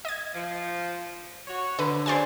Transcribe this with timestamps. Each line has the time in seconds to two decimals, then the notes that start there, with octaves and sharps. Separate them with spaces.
0.05 D#5 G#6
0.35 F3
1.47 F#4 C#5
1.79 B2 D3 B4
2.06 C#3 F#3 C5 D5 G#5